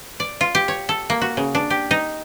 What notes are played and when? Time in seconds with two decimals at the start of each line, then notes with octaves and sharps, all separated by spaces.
0.20 D5
0.41 F4
0.55 G4
0.68 C#5
0.89 A4
1.10 A#3
1.21 F#4
1.37 C#3
1.55 D4
1.70 G4
1.91 D#4